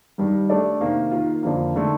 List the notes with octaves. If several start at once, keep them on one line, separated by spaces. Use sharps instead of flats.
G2 D#3 G3
A3 D4 A4 D5
C3 D#3 A#3
D#3 A#3 F4
F2 D3 F3 A#3
D3 A3 D#4